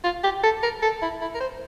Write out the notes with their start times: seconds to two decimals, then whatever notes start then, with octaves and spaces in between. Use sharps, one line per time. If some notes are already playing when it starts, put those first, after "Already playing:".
0.04 F4
0.24 G4
0.43 A4
0.63 A#4
0.82 A4
1.02 E4
1.21 E4
1.35 A#4
1.40 C5